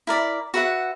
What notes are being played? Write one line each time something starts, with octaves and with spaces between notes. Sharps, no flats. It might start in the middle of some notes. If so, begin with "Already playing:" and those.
E4 A#4 D5 B5
F#4 B4 E5 F#5